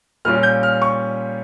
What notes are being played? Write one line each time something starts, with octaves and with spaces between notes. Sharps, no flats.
A#2 G3 C#4 F4 F6
G6
F6
C#6